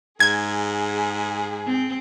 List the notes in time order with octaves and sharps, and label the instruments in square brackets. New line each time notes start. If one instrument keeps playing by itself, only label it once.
[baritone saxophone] G#2 [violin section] G#4 [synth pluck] G#6
[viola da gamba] C4